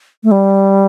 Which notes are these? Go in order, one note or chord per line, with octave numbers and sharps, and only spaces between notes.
A3
G3